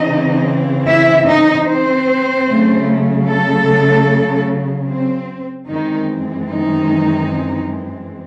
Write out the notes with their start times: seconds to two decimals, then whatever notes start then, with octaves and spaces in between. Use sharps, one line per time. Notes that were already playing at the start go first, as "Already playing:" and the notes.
Already playing: C#3 E3 C4 D#4 D#5
0.88 E4 E5
1.28 D#4 D#5
1.68 C4 C5
2.48 C#3 F#3 A3
3.27 A3 A4
4.88 C4
5.68 F#2 D#3 E3 G#3 C4 D#4
6.48 D#3 D#4